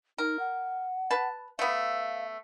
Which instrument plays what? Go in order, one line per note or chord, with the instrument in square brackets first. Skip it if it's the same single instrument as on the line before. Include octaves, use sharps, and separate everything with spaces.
[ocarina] D#4 [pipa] A#4
[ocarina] F#5
[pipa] B4 A5
[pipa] A3 B3 [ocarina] F5